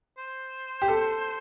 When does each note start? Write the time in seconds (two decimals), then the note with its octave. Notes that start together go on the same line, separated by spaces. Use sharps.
0.18 C5
0.82 G4
0.88 A4